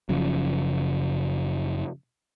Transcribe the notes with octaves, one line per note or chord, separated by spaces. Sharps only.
F#1 F#2 C#3 F3